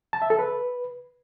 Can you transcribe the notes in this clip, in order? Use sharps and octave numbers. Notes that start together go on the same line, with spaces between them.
A5
E5
A4
B4